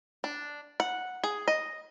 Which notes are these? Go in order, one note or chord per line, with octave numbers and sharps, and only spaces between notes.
D4
F#5
G#4
D#5